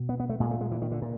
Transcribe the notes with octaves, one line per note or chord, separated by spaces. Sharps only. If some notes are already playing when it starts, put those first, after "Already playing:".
Already playing: B2
B3
B3
A3
A#2 G#3
A3
G#3
E3
D#3
D3
A#2